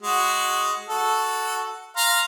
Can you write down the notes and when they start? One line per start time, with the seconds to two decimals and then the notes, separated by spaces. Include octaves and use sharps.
0.02 G#3 F#4
0.89 F#4 A4
1.97 F5 A#5 C6